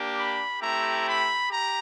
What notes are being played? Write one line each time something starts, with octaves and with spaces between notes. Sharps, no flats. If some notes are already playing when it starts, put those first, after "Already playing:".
Already playing: A#3 D4 G4
B5
A3 C4 E4 G4 A#5
B5
G4 A#5